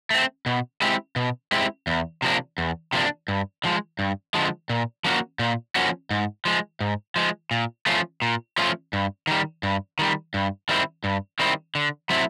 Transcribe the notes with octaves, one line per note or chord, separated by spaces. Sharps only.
A3 C4
B2
G#3 C4 E4 G4
B2
G#3 C4 E4 G4
E2
C3 F3 A#3 D4
E2
C3 F3 A#3 D4
G2
D3 F3 G#3
G2
D3 F3 G#3
A#2
F3 A#3 C#4 F#4
A#2
F3 A#3 C#4 F#4
G#2
F3 G#3
G#2
F3 G#3
A#2
F3 A3 C#4 F4
A#2
F3 A3 C#4 F4
G2
D#3 G3
G2
D#3 G3
G2
D#3 G3 C4 E4
G2
D#3 G3 C4 E4
D3
F#3 A3 C4 E4